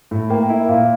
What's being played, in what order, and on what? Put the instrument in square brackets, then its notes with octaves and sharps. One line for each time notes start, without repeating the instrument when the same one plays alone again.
[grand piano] A2
[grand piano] A#3 [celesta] G5
[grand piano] E4
[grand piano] A#2 [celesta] F5